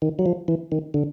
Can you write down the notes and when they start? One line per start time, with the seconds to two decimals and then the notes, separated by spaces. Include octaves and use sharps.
0.02 D#3
0.19 F#3
0.26 F3
0.48 E3
0.72 D#3
0.94 D3